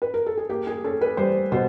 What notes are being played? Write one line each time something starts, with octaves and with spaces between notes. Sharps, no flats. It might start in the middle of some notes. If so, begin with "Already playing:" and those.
B4
A#4
A4
G#4
A#3 G4
G#4
C#4 A4
B4
G3 C5
B2 C5